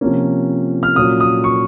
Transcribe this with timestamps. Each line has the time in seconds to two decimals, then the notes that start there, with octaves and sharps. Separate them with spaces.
0.01 C3 F3 A#3 C#4
0.83 F6
0.96 A#2 F#3 C#4 D#6
1.20 D#6
1.44 C#6